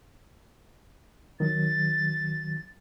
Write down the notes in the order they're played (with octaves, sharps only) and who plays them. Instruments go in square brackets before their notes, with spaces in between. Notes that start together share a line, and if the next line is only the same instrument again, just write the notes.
[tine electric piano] D#3 F#3 [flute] A6